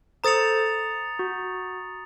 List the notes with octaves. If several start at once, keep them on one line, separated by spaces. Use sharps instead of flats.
A4 C5 A#5 D#6 A6 C#7 F7
F#4